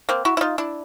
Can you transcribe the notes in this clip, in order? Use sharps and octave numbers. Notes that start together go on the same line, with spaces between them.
A#3 C4
E4 F#4
E4
D#4 F4
D4 E4